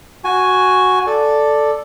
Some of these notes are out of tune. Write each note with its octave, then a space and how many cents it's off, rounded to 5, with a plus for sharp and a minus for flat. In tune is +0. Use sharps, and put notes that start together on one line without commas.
F#4 +0 G#5 +0
A4 +0 D5 +0